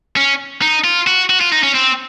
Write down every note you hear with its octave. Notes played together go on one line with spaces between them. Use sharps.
C#4
D#4
F4
F#4
F#4
F4
D#4
C#4
C4